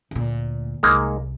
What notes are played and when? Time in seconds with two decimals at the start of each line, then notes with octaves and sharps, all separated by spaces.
0.11 D2 A#2
0.83 C2 G#3 A#3 D#4